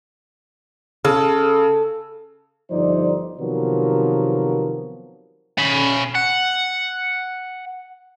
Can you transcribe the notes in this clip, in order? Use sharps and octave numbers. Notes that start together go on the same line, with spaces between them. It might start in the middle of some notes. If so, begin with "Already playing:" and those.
C#3 A4
G1 F3 D#4 C5 D5
C3 D#3 F3 F#3 B3 A#4
C#4 B5
F#5